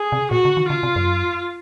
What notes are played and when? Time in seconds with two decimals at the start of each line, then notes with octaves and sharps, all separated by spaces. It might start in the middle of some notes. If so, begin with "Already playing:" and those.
Already playing: G#4
0.12 C3
0.31 A#2 F#4
0.45 C#3
0.57 D#3
0.70 C#3 F4
0.83 C3
0.96 F#2